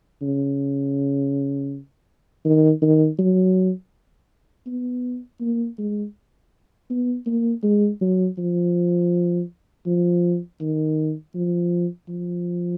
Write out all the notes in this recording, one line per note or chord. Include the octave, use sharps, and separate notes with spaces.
C#3
D#3
D#3
F#3
B3
A#3
G#3
B3
A#3
G#3
F#3
F3
F3
D#3
F3
F3